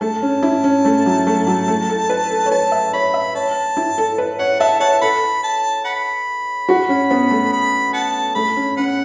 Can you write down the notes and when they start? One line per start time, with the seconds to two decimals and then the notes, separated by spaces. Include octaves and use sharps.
0.01 A3 A5
0.22 C#4
0.43 E4
0.64 C#4
0.85 A3
1.06 F#3
1.27 A3
1.47 F#3
1.68 A3
1.89 A4
2.10 B4
2.30 A4
2.46 C#5
2.51 B4 A5
2.72 E5
2.93 C#5 B5
3.14 E5
3.35 C#5 A5
3.77 E4
3.98 A4
4.18 B4
4.39 C#5 F#5
4.60 E5 A5
4.80 C#5 F#5 A5
5.01 A4 F#5 B5
5.43 A5
5.85 F#5 B5
6.69 F#4
6.89 C#4
7.11 B3
7.31 A3
7.52 B5
7.93 F#5 A5
8.35 A3 B5
8.56 C#4
8.77 C#4 B4 F#5